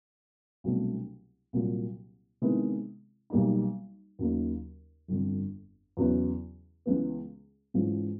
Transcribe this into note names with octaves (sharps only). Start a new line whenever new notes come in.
C2 B2 F#3 A3 D4
C2 A#2 F#3 A#3
C3 D#3 G#3 B3 E4
B1 B2 G3 A#3 D#4
D#2 C#3 F#3 A#3 D#4
G1 F2 D3
E2 C#3 F#3 B3 E4
C#2 C#3 E3 G#3 B3
G#2 E3 G#3 C#4 F4